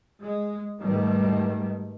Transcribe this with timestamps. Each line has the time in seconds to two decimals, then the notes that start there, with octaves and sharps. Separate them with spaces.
0.21 G#3
0.80 G#2 B2 D#3 G3 A3